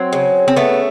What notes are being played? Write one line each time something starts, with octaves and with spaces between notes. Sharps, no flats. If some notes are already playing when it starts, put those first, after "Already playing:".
Already playing: F#3 C4
C#3
C4
A3 B3